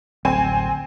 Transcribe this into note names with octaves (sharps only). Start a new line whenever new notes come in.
D1 A1 C4 G#5